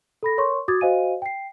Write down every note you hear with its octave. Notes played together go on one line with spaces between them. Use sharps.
A4 B5 A#6
A#4 C#5 C6 C#6
F#4 D6 D#6 G#6 A6
F#4 C5 D#5 F5 G#5 D#7
G5 C7